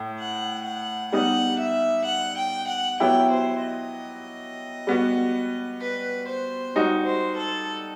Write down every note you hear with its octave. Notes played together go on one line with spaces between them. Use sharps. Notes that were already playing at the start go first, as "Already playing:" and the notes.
Already playing: A2
F#5
F#5
G3 B3 D#4 F#5
E5
F#5
G5
F#5
F#3 B3 E4 G4 G5
C5
D#5
G3 B3 F#4
B4
C5
G3 D#4 F#4
C5
A4